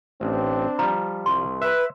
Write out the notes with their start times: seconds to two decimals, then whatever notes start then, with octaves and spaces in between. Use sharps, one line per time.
0.21 A1 C4 D4
0.79 F3 G3 A#5
1.26 C2 C6
1.62 B4 E5